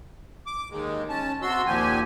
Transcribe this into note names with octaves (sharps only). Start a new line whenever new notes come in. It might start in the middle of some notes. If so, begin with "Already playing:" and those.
D6
D#2 G#3
C#4 A5
C3 F#4 C6 E6
D#2 A#2 F3 G4 G#5